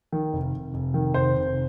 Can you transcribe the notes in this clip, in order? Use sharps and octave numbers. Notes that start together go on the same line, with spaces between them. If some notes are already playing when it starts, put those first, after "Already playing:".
D#3
F1
F1
F1
D#3
F1 C5
F1